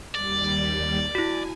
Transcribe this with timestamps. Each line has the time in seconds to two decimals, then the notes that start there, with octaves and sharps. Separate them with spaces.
0.15 D#2 G3 D5
1.15 E4 F#4 G#5